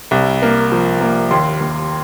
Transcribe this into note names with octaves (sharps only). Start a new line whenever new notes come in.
C2
A#3
F3
A#3
D#2 C6
D#2